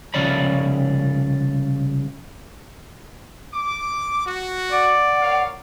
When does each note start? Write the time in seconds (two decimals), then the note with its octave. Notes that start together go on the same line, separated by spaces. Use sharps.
0.14 C2 C#3 F3 C#5 D5 B5
3.53 D6
4.25 F#4
4.72 D5 F#5
5.21 A#4 C#5 F5